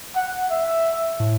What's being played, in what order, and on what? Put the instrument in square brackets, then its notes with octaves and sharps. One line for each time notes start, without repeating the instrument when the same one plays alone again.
[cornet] F#5
E5
[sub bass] A2